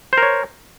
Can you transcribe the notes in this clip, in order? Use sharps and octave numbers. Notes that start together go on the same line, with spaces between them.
A#4 C5 C#5